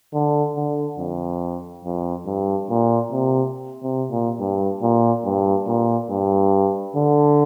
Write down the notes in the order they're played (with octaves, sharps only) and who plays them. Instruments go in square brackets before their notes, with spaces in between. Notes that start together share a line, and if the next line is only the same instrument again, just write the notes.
[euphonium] D3
D3
F2
F2
G2
A#2
C3
C3
A#2
G2
A#2
G2
A#2
G2
D3